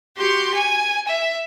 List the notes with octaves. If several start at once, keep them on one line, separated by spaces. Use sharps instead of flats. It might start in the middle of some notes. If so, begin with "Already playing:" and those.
F#4 G4 C6 G6
G#5
E5